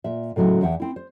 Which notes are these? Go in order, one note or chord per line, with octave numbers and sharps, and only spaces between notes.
A#2 E5
A2 C#3 F#3 G#3 E4
E2 E5 F#5 G5
C4 E4
C5